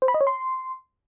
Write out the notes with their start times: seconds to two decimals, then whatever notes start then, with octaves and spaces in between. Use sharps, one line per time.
0.02 C5
0.08 B5
0.14 D#5
0.21 C#5
0.27 C6